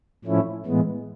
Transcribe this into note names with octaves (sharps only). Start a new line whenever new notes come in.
A2 F3 A3 C#4 E4
A2 E3 G#3 B3